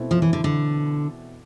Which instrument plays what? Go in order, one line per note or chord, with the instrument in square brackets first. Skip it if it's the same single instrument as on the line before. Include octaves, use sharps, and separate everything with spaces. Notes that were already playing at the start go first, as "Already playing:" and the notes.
Already playing: [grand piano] B2 A3 C4 E4
[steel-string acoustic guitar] F3
E3
D3
D3